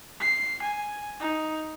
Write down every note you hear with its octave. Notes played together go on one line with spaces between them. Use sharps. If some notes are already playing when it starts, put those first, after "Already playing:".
C7
G#5
D#4